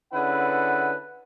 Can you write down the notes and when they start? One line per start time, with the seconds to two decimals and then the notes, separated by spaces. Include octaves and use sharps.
0.13 D3 C#4 E4 G#4 B4 F#5